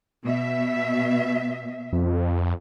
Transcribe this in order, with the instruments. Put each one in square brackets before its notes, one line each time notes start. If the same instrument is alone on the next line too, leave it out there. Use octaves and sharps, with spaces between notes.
[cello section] B2 E5
[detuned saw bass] F2